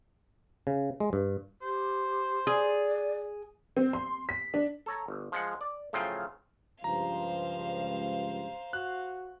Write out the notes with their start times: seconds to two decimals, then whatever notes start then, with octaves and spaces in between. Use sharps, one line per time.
0.67 C#3
1.00 G#3
1.13 G2
1.62 G4 C5
2.47 G#4 D5
3.77 C4
3.93 C6
4.29 B6
4.54 D4
4.86 A4 C#5 A#5
5.08 G1
5.32 F3 G#3 F#5
5.61 D5
5.93 A2 C#3 F3 F#3 F4 G5
6.84 C#2 G2 F3 C5 F5 A#5
8.73 F#4 F#6